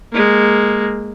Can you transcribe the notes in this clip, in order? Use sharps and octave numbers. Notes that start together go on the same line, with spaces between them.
G#3 A#3